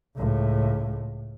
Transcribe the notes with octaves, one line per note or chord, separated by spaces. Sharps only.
C#2 A2